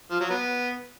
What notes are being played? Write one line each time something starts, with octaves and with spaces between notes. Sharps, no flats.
F3
F#3
B3